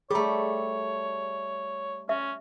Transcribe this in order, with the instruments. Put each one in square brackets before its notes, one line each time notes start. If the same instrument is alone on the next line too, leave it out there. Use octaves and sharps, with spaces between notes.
[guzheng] G3 A3 [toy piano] G#4 A#5 [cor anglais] C#5
[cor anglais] C#4 [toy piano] E5